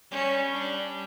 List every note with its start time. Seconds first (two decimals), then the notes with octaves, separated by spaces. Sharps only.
0.11 G3 C#4
0.53 D4